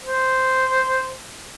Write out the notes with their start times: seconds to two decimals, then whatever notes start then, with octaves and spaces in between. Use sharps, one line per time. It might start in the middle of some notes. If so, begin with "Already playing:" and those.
0.03 C5